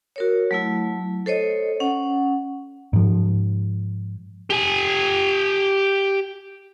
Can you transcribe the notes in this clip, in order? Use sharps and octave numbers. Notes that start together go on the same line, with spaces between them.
F#4 A#4 C#5
F#3 A3 E4
A4 C5 C#5 D#5
C#4 F#5
G#2 F3
G4 G#5